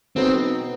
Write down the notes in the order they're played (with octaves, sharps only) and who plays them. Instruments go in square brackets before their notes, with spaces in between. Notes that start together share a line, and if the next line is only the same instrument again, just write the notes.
[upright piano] B2 F#3 B3 D#4 F#4 [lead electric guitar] C4